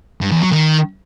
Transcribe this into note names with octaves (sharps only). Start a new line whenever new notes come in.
G2
E2
F#3
D#3